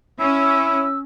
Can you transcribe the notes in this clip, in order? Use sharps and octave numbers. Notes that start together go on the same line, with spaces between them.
C#4 E4 E6